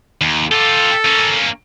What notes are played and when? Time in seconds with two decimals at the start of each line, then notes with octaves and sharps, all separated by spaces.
0.21 D#2
0.51 F4 G4 A4
1.05 A#3 C#4